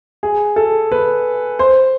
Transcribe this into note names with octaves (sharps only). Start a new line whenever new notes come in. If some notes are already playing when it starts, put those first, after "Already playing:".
G#4
A4
B4
C5